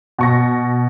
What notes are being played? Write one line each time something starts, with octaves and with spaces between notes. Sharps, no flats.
B2 C#6 A#6